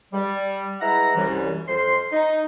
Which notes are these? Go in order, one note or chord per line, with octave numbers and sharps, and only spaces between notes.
G3
G#3 E4 B4 E5 F#5 A#5
C2 F#2 E3 G3
F2 C5 C6
D#4